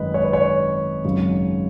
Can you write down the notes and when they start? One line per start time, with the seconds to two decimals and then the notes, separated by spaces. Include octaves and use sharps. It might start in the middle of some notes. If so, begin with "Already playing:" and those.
Already playing: G#1 F#2 D#3 G#3 B4 D#5
0.14 C#5
0.24 B4
0.33 C#5
1.05 G#1 F#2 C#3 F#3